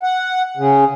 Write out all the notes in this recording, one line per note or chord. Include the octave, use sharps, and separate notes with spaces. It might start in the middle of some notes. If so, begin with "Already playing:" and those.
F#5
C#3